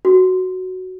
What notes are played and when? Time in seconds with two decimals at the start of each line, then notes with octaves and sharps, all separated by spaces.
0.05 F#4